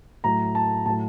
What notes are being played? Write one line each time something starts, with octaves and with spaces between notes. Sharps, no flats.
A2 F#3 A#5
A5
A2 F#3 A5